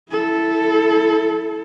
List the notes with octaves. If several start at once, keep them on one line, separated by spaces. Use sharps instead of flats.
E4 A4